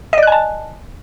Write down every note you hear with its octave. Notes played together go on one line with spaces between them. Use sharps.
D5 D#5 G#5 A5 F#6